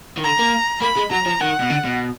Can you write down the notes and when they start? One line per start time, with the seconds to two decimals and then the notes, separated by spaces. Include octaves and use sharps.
0.17 D#3
0.24 D3 A#5
0.39 A#3
0.82 A#3 B5
0.96 G#3
1.11 F#3 A#5
1.26 F3
1.41 D#3 F#5
1.60 B2
1.70 D3
1.84 B2